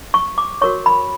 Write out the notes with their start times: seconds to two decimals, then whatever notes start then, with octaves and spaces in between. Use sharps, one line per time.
0.14 C#6
0.38 D6
0.61 F#4 A#4 C#5 C#6
0.86 B5